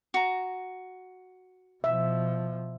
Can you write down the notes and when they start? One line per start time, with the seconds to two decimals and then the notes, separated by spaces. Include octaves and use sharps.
0.14 F#4 A#5
1.84 B2 F3 E5